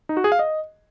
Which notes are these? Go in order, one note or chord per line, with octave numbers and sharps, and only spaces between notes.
D#4
F#4
G#4
F5
D#5